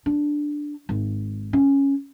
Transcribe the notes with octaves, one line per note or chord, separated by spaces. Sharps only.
D4
G#1
C#4